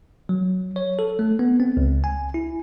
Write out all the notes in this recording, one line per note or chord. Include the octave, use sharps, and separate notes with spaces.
F#3
C#5
A4
A3
B3
C4
C#2
G#5
E4